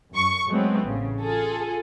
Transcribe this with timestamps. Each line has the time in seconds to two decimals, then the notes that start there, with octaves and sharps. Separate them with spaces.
0.10 F#2 C#6
0.47 F#3 G#3 A3 B3 C4
0.83 A1 C#3
1.20 F4 G#4 A4